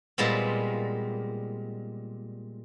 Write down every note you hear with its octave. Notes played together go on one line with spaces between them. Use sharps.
A#2 G3 G#3 B3 C4